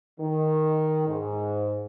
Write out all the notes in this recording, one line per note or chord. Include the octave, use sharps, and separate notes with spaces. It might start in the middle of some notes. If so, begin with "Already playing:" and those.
D#3
G#2